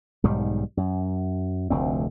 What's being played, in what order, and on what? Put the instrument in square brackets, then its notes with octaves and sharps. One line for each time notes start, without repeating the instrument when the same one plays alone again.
[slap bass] B1 G#2 D#3 G3
F#2
F1 D2 C4